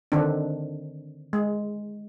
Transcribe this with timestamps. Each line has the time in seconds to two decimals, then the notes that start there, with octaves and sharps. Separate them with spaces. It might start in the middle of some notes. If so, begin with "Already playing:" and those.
0.12 D3 D#3 C4 D4
1.33 G#3